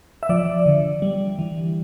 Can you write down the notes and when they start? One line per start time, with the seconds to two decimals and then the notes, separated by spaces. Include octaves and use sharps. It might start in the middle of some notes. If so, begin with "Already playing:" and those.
0.23 E5
0.29 F3 D5
0.66 D3
1.02 G3
1.39 E3